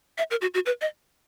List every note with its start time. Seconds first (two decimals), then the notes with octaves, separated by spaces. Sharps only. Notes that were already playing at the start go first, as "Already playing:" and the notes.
0.18 E5
0.31 A#4
0.42 F#4
0.54 F#4
0.66 B4
0.81 D#5